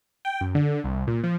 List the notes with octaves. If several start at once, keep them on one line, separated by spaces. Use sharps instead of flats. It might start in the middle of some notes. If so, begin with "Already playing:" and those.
G5
F#2
D3
C2
A#2
F3